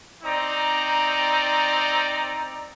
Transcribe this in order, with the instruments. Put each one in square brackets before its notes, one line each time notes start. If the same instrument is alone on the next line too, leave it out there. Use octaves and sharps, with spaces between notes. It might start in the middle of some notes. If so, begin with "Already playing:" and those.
[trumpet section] C4 D#4 D5 A#5